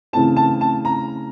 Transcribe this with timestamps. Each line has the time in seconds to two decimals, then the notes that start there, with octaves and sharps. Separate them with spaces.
0.13 C#3 E3 A3 C4 A5
0.36 A5
0.61 A5
0.85 A#5